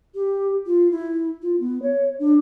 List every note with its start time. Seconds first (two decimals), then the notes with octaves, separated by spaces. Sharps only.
0.15 G4
0.66 F4
0.91 E4
1.42 F4
1.60 B3
1.82 C#5
2.19 D4